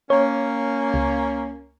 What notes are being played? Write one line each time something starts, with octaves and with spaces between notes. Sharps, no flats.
A#3 C#4 C#5
C#2